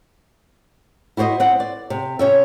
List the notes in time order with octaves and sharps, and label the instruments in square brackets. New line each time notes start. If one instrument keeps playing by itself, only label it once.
[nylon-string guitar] E4 F#4 C5 C#5 D#5
C4 F#5
D5
C3
C3 C#4 E5